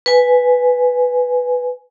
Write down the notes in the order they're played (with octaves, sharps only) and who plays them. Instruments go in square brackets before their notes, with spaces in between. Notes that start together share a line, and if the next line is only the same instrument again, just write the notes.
[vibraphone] B4 G#5